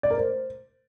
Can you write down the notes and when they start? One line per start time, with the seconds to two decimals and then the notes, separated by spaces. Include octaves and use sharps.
0.03 D5
0.11 A#4
0.18 C5